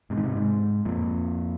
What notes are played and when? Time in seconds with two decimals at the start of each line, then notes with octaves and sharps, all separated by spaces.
0.10 G#2 C3
0.17 D#3
0.23 G#2 C3
0.35 G#2
0.85 F2 A#2